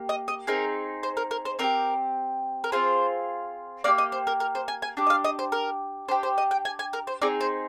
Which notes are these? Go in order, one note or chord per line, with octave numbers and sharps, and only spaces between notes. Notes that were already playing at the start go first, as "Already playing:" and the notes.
Already playing: A#3 G4
D#5
D#5
C4 D#4 G#4 A#4
C5
A#4
A#4
C5
C4 D#4 G4 A#4
A#4
C4 F4 G#4 C5
A#3 D#4 G4 D5
D#5
C5
A#4
A#4
C5
G#5
G#5
D4 G4
D#5
F5
D#5
C5
A#4
D4 G4 C5
C5
D#5
G5
G#5
G#5
A#4
C5
C4 D#4 G#4 D5
C5